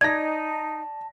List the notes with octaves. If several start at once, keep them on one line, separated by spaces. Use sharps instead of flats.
D#4 D5 A5 G#6 A#6